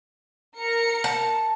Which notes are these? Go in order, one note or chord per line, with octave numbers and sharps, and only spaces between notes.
A#4 A#5 C#7
A5